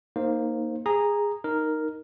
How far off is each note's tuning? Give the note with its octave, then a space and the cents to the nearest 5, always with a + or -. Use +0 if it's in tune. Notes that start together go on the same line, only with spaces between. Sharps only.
A#3 +0 D#4 +0 C5 +15
G#4 -15 A#5 +0
D#4 +0 A#4 +0